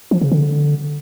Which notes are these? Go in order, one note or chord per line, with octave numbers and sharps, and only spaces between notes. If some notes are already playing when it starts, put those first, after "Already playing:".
F3
C#3
D3